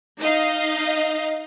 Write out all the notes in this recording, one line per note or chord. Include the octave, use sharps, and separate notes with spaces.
D#4 D#5 F5